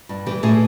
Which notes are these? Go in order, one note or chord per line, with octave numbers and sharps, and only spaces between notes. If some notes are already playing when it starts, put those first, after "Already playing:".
G2
E3 G4
A2 G#4